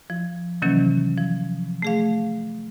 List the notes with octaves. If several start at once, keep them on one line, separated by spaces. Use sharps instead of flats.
F3
C3 D#3 E3 F#3 A#3 C#4
F3
A3 G#4 F5